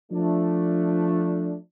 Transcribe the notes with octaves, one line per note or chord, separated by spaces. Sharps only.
F3 A3 D4